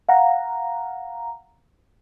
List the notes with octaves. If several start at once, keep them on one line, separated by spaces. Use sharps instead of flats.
F5 F#5 A#5